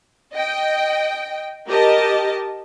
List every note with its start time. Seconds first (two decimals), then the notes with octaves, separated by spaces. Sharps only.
0.33 D#5 G5
1.68 G4 A#4 D#5 A5